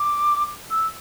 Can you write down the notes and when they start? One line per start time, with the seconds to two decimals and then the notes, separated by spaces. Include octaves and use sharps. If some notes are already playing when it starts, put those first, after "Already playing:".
Already playing: D6
0.71 E6